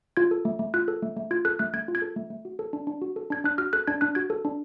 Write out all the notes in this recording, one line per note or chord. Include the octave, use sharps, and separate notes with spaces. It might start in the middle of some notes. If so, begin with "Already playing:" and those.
F4 G#6
A4
A3
A3
F4 F#6
A4
A3
A3
F4 G#6
A4 F#6
A3 F#6
A3 G#6
F4
G#6
A4
A3
A3
F#4
A4
D4
D4
F#4
A4
D4 G#6
D4 F#6
F#4 F6
A4 F#6
D4 G#6
D4 F#6
F#4 G#6
A4
D4